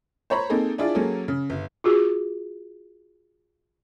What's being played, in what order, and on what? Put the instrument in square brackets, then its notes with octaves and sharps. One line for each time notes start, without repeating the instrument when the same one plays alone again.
[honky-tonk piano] C5 C#5 A#5 B5
A#3 C4 D#4 G#4 A4
D4 E4 F4 G#4 D5
F#3 A#3 C#4 G#4 A4
C#3
G1
[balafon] F4 F#4 G#4